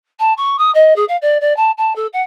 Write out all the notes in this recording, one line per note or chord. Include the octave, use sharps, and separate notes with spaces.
A5
C#6
D#6
D#5
G#4
F5
D5
D5
A5
A5
A4
F#5